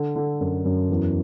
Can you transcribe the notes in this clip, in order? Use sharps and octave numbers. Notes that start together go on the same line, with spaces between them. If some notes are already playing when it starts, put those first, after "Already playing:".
Already playing: D3
D3
F#2
F#2
E2